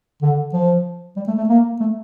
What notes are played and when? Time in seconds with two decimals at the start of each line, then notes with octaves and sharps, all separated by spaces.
0.22 D3
0.53 F3
1.16 G3
1.28 A3
1.38 A3
1.49 A#3
1.80 A3